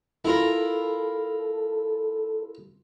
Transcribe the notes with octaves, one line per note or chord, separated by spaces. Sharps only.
E4 F4 A4 A#4